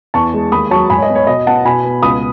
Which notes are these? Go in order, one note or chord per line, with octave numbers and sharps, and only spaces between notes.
E2 A5 C#6
G#3
D#2 B5 D#6
F#3 A5 C#6
G#2 G#5 B5
C#5
D#5
B3
C#5
B2 D#5
B3 F#5 A5
B2 G#5 B5
B3
C#2 B5 D#6